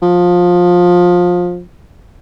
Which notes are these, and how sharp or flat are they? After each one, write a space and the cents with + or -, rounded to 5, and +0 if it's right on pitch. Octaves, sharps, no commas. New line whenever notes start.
F3 +20